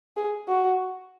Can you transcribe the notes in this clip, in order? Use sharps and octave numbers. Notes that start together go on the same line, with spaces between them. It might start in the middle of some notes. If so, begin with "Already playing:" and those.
G#4
F#4